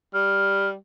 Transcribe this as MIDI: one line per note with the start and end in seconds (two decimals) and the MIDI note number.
0.14 0.75 55
0.14 0.69 89